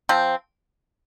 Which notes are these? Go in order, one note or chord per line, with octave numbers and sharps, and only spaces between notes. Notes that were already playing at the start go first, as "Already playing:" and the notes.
F3 C4